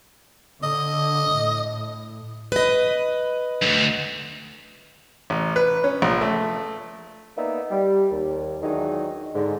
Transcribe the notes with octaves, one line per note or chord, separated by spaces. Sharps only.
D3 D#5
A2
B4 D#5
D2 G2
A1
B4
C#4
A#1
A3
A#3 B3 D#4 B4 D5 E5
G3
D#2
D#3 E3 F#3 G#3 D4 D#4
G#2 D3